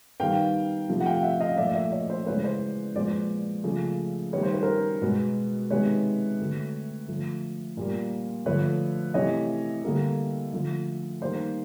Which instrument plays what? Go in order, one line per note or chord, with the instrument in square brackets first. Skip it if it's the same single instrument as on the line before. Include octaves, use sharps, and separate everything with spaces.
[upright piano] D#3 G3 B3 F5 G5
C3 F3 A3
F#5
F5 G5
E5 F#5
D#5 F5
A#2 F3 A3 D5 E5
D5 E5
C#5 D#5
C5 D5
C#3 E3 G#3 B3 B4 C#5
C5 D5
A#2 F3 G#3 B3 C5 D5
C#3 F3 A3
D#3 G3 B3 C#5
C5
B4
A#4 C5
B2 G#3 B3
C3 D#3 G#3 B3 B4 C#5
D3 F#3 A3
D3 F3 A3
A#2 G3 A#3
D3 F3 A3 B4 C#5
C3 E3 A3 C#5 D#5
D3 G3 A#3
D3 F3 A3
D#3 G3 A#3 C5 D5